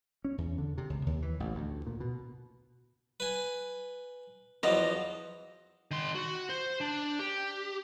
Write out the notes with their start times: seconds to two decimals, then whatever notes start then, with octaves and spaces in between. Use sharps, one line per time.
0.25 C#4
0.38 E2
0.58 D3
0.78 C3
0.90 C#2
1.07 D#2
1.22 E3
1.40 A1
1.55 D2
1.87 A#2
2.00 B2
3.20 B4 G#5
4.63 E2 F3 F#3 D#5
5.91 D#3 C6
6.15 F#4
6.49 C5
6.81 D4
7.19 G4